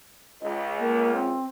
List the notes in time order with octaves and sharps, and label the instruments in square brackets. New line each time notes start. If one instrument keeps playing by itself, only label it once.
[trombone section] C#2 [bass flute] D#5
[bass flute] A#3
C4